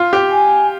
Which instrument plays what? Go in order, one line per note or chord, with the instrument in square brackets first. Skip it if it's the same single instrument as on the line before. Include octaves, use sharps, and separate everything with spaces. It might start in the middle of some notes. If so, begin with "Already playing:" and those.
Already playing: [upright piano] F4
G4
[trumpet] G#5